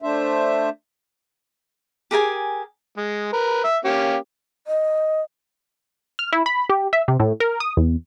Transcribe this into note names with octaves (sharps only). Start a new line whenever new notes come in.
A3 D4 C5 E5
G4 G#4 A#4 G#5
G#3
A#4 B4
E5
A#3 C#4 G4
D#5
F6
E4
B5
G4
E5
C3
A2
A#4
D#6
E2